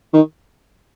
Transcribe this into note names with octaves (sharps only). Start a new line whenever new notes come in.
D#3